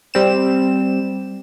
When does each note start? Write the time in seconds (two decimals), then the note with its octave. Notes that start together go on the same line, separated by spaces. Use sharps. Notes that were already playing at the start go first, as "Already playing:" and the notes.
0.14 G3 C4 E7